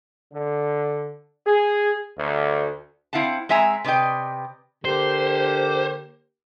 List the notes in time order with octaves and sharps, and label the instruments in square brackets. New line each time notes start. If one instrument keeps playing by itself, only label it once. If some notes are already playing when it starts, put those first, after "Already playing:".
[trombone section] D3
G#4
D2
[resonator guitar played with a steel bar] C4 E4 F5 F#5 A5
G#3 C4 E5 G#5 A#5
C3 B4 D5 D#5 G5
[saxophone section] D3 A#3 G4 [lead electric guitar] C5